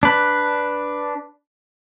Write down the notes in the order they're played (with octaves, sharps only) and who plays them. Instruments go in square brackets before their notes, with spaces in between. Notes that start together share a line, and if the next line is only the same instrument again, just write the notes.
[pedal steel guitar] D4 B4